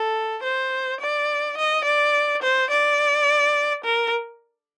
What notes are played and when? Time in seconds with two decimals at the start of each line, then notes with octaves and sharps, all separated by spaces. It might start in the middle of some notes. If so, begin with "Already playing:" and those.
Already playing: A4
0.43 C5
1.00 D5
1.57 D#5
1.85 D5
2.42 C5
2.70 D5
3.85 A#4